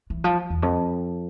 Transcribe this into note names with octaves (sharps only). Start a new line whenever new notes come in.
E3
F3
E2
F2